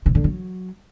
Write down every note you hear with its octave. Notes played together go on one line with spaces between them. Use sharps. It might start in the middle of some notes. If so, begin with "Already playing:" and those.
C3
D3
F#3